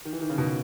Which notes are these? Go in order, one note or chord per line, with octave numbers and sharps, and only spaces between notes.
D#3
E3
D#3
C#3
B2